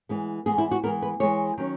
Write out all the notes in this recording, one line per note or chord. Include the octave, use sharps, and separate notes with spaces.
E3 G#3 B3
E3 G#3 B3 G#4
E4
F#4
E3 G#3 B3 A#4
B4
E3 G#3 B3 C#5
D#3 F#3 C#4